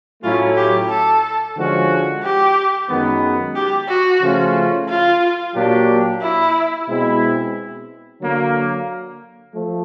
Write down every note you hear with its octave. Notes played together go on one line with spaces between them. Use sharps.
A2 F#3 A3 C#4 E4 F4
G4
A4
D3 F3 G#3 C#4 F#4
G4
F#2 D#3 G#3 B3
G4
F#4
C#3 F3 A3 C#4 F4
F4
A#2 F#3 A#3 D4 G4
E4
B2 G#3 C4 E4
D3 F#3 A#3
F3 A3